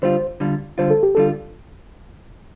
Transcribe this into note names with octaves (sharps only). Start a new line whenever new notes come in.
D3 G3 F4 C5
D3 G3 F4
D3 G3 F4 C5
A4
G4
D3 G3 F4 A4